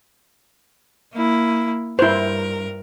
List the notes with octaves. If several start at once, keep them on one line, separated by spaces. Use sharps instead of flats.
A#3 E4
G2 E4 A#4 C5